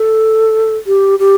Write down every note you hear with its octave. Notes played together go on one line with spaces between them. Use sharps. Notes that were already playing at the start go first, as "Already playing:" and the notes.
Already playing: A4
G4
G4